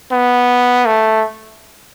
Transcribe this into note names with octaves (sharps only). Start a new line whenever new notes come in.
B3
A3